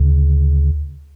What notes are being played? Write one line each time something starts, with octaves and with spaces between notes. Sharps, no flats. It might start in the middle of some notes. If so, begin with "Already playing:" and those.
Already playing: D2 C#3